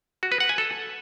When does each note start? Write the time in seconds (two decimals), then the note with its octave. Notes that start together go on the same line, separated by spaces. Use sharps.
0.23 F#4
0.32 B4
0.40 F#5
0.49 G#5
0.58 A4